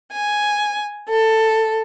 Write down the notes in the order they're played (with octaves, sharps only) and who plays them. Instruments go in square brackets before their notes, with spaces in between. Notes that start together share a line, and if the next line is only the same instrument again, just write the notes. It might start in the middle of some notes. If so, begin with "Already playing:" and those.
[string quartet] G#5
A4